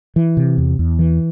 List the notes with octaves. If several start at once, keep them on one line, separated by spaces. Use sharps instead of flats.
E3
C3
E2
E2
E3